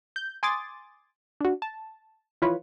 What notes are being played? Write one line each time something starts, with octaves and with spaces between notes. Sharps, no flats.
G6
G#5 C6 D6 D#6 A6
D4 F#4
A5
E3 F3 F4 B4 C#5